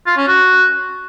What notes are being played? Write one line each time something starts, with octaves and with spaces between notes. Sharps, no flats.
F4
C#4
F#4